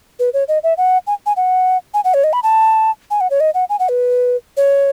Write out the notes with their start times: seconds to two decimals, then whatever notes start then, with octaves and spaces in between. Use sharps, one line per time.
0.19 B4
0.34 C#5
0.48 D#5
0.63 E5
0.77 F#5
1.07 G#5
1.26 G#5
1.37 F#5
1.94 G#5
2.04 F#5
2.14 C#5
2.24 D#5
2.33 B5
2.43 A5
3.11 G#5
3.21 F#5
3.31 C#5
3.40 D#5
3.54 F#5
3.69 G#5
3.79 F#5
3.89 B4
4.57 C#5